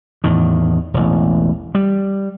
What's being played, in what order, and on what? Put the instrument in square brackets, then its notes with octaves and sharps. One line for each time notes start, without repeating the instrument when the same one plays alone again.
[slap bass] E2 A2 D#3
E1 A1
G3